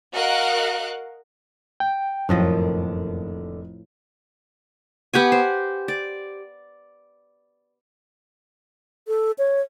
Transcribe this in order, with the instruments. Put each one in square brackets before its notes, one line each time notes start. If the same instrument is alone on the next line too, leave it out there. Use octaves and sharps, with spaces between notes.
[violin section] F#4 A#4 D#5 F5 F#5 F#6
[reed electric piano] G5
[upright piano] F1 [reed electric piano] F#2 [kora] A2 F3 D#5 [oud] D3 D#3 A#3
[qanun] B3 G4 F#5 G#5
C5
D5
[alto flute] A4
C#5